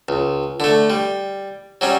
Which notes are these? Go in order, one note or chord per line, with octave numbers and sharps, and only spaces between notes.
C#2
D3 A3
G3
F#3 G3 C#4